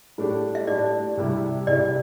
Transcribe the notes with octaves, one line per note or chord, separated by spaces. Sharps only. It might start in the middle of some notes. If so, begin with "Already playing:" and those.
A2 A3 D4 G4
E5
A2 A3 D4 G4 D5
C2 C3 G3 E4 G4
C2 C3 G3 E4 G4 D5